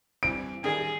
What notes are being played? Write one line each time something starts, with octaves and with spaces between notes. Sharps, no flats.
G2 E3 C4 D7
A1 D#3 G3 G#4